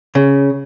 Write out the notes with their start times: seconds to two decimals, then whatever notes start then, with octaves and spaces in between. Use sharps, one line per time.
0.15 C#3